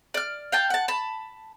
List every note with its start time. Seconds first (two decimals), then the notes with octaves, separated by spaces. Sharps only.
0.14 D5 F6
0.52 F5 G5 A5
0.70 F#5 A5
0.88 A5 B5